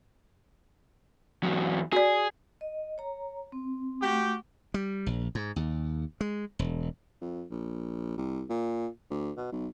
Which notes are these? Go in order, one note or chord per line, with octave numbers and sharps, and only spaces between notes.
E2 F#3
F#4 G#4 D5
D#5
C#5 A#5
C4
A3 F#4 G4
G3
A#1
G#2
D#2
G#3
E1
F2
A#1
C2
A#2
D2
B2
B1